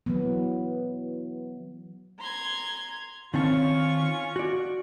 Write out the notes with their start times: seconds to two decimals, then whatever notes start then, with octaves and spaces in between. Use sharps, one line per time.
0.06 E3 F#3 B3
2.19 A#5 C6 G#6
3.34 D#3 C4 C#4 F4 A5 C#6
4.36 F#4 D5